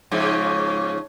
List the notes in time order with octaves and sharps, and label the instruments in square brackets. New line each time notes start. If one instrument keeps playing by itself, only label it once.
[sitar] G#2 C#3 F3